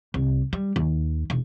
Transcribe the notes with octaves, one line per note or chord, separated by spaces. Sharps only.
C2
G3
D#2
E1